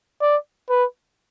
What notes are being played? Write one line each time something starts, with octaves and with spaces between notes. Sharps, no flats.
D5
B4